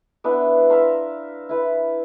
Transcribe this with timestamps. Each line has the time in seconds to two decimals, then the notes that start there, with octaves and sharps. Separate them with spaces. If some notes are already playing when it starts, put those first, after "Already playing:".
0.24 B3 D4 E4
0.69 E5 F5 A#5 C6
1.49 E4 B4